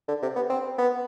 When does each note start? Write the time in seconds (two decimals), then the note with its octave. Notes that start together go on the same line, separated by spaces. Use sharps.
0.08 D3
0.22 C3
0.36 B3
0.50 C4
0.78 B3